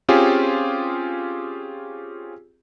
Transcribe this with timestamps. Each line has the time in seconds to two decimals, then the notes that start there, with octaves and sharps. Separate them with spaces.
0.08 C4 C#4 F4 G4 G#4